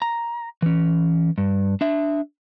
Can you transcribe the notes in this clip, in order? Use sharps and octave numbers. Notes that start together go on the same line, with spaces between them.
A#5
E3 C#4
G2
D4 E5